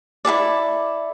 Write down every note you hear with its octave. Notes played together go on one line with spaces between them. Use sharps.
E4 G#4 A4 D5